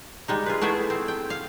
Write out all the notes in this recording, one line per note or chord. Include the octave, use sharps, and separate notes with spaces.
G3 G#3 D#4
F4 G#4 B4
A3 B3 E4 G#4 C5
C4
G5
F5